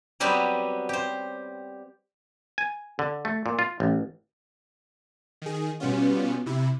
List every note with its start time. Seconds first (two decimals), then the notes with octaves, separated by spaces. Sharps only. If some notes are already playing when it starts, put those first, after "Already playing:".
0.20 F#3 G3 B3 C4 G4 B4
0.89 G4 C5
2.58 G#5
2.99 D3
3.25 A3
3.46 A#2
3.59 F4
3.80 A1
5.42 D#3 G#4
5.80 B2 G3 B3 C#4 F4
6.46 C3 E4